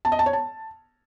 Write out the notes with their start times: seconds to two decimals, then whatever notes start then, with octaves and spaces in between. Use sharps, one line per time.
0.05 A5
0.12 D#5
0.19 A5
0.26 C#5
0.33 A5